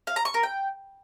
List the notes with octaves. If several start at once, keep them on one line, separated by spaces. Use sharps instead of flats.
F5
A#5
C#6
A#4
G5